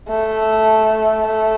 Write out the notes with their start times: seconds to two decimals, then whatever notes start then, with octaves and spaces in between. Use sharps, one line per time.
0.09 A3
1.26 A3